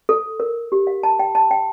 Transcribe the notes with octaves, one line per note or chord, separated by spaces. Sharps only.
A4
A#4
G4
F5
A5
G5
A5
G5